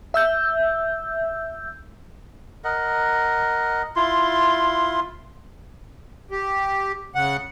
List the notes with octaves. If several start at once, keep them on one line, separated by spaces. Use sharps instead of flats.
E5 E6 G6
A#4 D#5 F#5
E4 F4 C6
G4
C#3 F#5